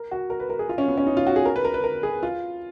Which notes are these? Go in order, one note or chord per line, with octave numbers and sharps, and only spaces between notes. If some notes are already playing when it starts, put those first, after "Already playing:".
Already playing: A#4
F#4
A#4
B4
A#4
G#4
F4
C#4
B3
C#4
D#4
F4
F#4
G#4
A#4
B4
A#4
B4
A#4
G#4
F4